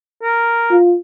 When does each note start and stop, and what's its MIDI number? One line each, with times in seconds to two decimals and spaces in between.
0.23 0.75 70
0.71 0.96 65